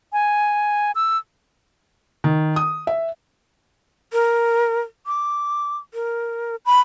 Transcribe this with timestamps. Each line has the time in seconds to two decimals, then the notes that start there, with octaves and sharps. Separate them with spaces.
0.13 G#5
0.95 E6
2.24 D#3
2.56 D#6
2.87 E5
4.11 A#4
5.07 D6
5.94 A#4
6.66 B5